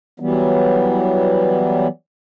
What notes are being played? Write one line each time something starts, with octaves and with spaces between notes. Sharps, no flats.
E3 F#3 G3 B3